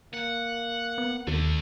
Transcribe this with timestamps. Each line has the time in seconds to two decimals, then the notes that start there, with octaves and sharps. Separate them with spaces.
0.14 A#3 F#5
0.98 B3
1.27 D#2 D3 A3